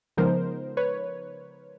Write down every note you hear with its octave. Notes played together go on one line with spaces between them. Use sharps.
C#3 F3 G#3 B3 D#4 A#4 C5
B4 C#5